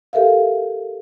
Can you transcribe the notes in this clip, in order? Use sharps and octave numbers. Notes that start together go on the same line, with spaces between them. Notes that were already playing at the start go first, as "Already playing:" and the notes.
G4 A4 A#4 E5 F5